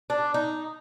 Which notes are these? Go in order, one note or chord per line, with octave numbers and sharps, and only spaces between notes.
D4
D#4